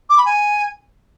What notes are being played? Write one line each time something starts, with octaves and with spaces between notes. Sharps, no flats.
D6
B5
G#5